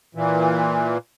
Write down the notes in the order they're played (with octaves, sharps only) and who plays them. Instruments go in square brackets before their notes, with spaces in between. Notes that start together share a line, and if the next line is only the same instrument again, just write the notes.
[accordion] A#2 E3